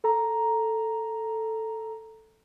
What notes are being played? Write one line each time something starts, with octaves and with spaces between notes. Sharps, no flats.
A4 A#5